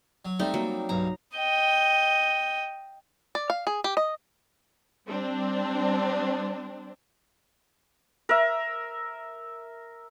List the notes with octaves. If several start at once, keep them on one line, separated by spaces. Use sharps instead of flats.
F#3
G3 A3 C4 D#4
F#3 A#3
B1 G2 A#5
D#5 G5
D5
F5
G#4
G4
D#5
G3 C4 D4
A#4 E5